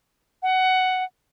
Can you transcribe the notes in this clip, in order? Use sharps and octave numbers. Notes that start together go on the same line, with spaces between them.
F#5